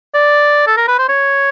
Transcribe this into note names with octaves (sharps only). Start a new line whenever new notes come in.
D5
A4
A#4
B4
C5
C#5